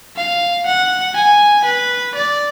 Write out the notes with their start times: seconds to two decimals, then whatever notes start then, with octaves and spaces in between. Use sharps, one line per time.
0.17 F5
0.66 F#5
1.17 G#5
1.65 B4
2.15 D5